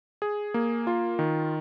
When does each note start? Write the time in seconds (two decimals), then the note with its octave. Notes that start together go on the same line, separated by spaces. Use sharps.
0.22 G#4
0.54 A#3
0.87 F4
1.19 D#3